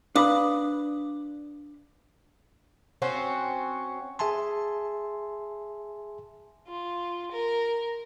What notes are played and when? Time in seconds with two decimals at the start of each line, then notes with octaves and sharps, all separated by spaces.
0.15 D4 B4 F5 B5 D6 D#6
3.02 C4 C#4 F#4
4.19 G#4 E5 G#5 A5 C6
6.68 F4
7.31 A#4